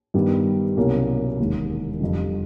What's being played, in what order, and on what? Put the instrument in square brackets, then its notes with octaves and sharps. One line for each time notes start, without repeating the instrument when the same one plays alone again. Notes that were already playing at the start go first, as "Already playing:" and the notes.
[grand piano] G2 D#3 G3 B3
C2 B2 F#3 A#3 C#4
E1 D#2 D#3 G#3
F2 D3 G3